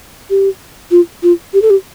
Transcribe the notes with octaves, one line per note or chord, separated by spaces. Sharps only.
G4
F4
F4
G4
A4
G4